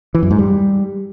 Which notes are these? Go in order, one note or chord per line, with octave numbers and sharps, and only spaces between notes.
E3
F#2
G#2
G3